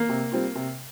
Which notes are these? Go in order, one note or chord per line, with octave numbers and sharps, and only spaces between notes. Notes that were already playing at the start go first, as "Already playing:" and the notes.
Already playing: A#3
C3
G3 C4 F4
C3